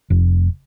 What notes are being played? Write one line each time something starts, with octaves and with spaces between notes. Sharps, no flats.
F1